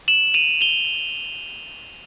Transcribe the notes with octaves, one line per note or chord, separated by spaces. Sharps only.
E7 F#7
D#7 F7
F7 G7